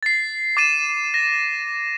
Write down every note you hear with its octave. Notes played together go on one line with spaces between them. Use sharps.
A6 C7
D6 A6 D#7 E7
A#6